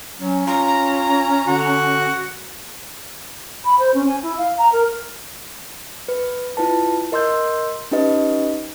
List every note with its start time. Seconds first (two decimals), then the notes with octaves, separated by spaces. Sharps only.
0.19 F#3 C#4
0.47 F4 A#5
1.47 D3 F#4
3.64 B5
3.78 C5
3.94 C#4
4.06 G#5
4.22 E4
4.37 F5
4.57 A#5
4.72 A#4
6.08 B4
6.57 E4 F4 B4 A5
7.12 A#4 D#5 C6 E6 G6
7.91 C#4 D#4 G4 B4 D#5